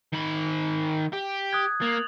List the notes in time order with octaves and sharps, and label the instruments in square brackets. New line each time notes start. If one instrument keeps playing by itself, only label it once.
[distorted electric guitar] D#3 B5
G4
[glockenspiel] D#6 F#6 G#6
[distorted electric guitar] A#3 [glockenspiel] A6 F7 F#7